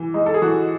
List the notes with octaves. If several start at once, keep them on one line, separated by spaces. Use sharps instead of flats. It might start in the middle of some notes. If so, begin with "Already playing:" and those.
Already playing: E3
G#3 D#4
A4
G#4
E3 F#4